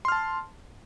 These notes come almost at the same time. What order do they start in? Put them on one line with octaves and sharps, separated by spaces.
C6 F6 A5